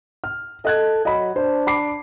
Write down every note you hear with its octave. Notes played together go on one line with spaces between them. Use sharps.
F6
A4 D#5 F#6 G#6
F#3 D#5 B5
D4 C5
B5 D6 C7